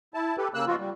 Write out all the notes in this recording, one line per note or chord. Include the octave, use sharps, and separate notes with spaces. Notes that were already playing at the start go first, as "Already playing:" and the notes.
E4 A5
G4 A4 B4
C#3 A#3 E6 F#6
B2 F3 F4 F#4
G3